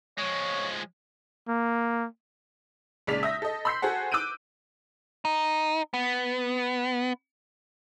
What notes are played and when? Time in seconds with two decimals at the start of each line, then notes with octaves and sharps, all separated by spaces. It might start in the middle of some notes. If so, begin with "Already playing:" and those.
0.18 F3 G#3 C#5
1.48 A#3
3.07 A#1 C#3 G#3 D5 B6 F7
3.23 E5 D#6 G6 A#6
3.42 A4 D#5
3.65 B5 C6 E6 G6 B6 C7
3.82 F#4 G#4 A4 C5 F#5
4.12 D6 E6 F#6 G6 D7 D#7
5.25 D#4
5.94 B3